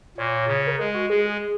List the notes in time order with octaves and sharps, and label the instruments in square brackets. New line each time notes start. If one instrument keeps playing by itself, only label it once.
[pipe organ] A#2 [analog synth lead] C#5
[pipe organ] C#3
[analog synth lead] A#4
[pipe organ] G#3 [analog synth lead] G#4
[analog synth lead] F#4
[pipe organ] G#3 [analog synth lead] G#4
[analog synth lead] G#4